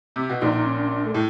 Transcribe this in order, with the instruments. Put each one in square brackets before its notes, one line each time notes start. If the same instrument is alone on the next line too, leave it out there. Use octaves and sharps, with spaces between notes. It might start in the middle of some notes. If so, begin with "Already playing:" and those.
[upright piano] C3
B2
[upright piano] A#1 A#2 [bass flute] D#4
[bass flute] D#4
C#4
D4
C#4
D4
A3
[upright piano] A2 [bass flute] G#3